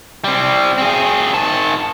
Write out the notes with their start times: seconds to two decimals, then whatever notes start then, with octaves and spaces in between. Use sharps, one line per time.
0.24 G3 C4
0.78 C4 G#4
1.33 D#3 A5